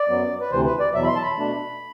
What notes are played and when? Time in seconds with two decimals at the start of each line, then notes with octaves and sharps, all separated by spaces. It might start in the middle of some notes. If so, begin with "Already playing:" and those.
Already playing: D5
0.09 F#2 F#3 B3
0.41 B4
0.51 D2 C3 E3 C5
0.66 B4
0.80 D5
0.94 E2 B2 F#3 E5
1.03 B5
1.08 C6
1.16 A5
1.22 B5
1.37 B2 A3 D4